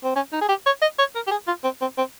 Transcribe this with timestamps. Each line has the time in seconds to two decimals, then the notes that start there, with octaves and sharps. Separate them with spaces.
0.04 C4
0.16 C#4
0.32 D#4
0.41 G#4
0.49 G4
0.66 C#5
0.82 D#5
0.99 C#5
1.15 A#4
1.27 G4
1.31 G#4
1.47 F4
1.64 C4
1.81 C4
1.98 C4